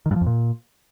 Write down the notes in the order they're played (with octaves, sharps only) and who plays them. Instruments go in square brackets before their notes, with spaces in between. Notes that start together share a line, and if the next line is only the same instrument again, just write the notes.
[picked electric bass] D#3
G2
F3
F2
A#2